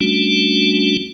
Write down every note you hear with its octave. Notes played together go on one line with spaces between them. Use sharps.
G3 A3 C#4 D4 F#4